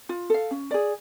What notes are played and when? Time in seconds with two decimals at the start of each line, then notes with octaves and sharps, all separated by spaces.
0.09 F4
0.30 A4 F5
0.51 C#4
0.71 G#4 D5